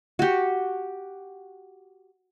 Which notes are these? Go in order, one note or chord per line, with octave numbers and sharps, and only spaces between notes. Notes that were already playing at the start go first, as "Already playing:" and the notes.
F#4 G4